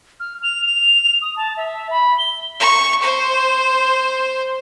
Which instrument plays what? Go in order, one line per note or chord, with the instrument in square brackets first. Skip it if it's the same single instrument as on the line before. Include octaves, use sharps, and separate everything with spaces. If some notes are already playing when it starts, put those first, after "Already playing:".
[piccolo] F6
F7
F7
D#6
A5
E5
B5
G7
[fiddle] C#6
C5